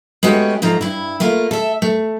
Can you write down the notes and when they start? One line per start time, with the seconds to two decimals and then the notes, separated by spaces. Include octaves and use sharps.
0.23 G#3 A3 B3 C#4 F#4 G4
0.62 G#2 F3 A3 A#5
0.81 G2 E4
1.20 A3 A#3 F4
1.51 A4 E5
1.82 A3